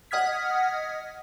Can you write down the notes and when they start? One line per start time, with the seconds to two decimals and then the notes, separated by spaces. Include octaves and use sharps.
0.11 D#5 F#5 D#6 F6 G#6 B6